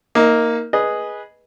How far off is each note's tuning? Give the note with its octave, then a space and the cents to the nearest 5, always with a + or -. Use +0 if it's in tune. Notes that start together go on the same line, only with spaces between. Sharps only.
A#3 +0 D#4 +25
G#4 +0 B4 -15 D#5 +0